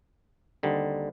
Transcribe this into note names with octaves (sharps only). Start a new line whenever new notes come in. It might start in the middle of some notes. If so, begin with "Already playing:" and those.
D#2 D3 G3 C4 D#4